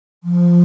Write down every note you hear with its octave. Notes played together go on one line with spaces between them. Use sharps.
F3